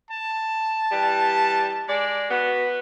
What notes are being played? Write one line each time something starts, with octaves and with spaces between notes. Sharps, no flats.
A5
E3 G3
G#3 D5
B3 F#4